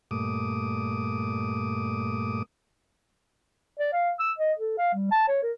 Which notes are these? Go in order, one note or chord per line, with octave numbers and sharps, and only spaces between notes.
G2 A#2 A3 D6 D#6
D5
F5
E6
D#5
A4
F5
G3
A5
C#5
A#4